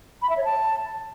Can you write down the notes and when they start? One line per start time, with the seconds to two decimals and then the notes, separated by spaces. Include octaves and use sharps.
0.22 B5
0.30 E5
0.37 C#5
0.45 A5